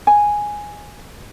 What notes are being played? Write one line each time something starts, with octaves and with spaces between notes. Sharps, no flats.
G#5